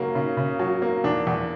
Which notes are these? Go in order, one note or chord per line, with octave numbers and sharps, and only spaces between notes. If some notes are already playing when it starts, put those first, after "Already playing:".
Already playing: C#3 F#3 A#3
C#3
C#3
F#3
A#3
E2 D4
E2